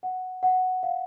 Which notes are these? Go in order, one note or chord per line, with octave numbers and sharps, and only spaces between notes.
F#5
F#5
F5